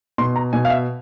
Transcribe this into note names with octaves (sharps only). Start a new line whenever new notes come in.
B2 C6
A#5
B2 G#5
F5
E5